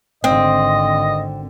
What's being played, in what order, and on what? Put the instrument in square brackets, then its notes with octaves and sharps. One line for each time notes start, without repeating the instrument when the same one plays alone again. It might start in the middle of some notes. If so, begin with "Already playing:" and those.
[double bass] G#1 D3 [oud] C4 [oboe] D#5